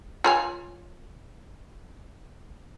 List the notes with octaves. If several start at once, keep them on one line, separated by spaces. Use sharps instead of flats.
F4 C#5 G#5